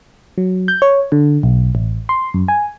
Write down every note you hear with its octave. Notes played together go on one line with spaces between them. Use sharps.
F#3
G6
C#5
D3
B1
A1
C6
F#2
G#5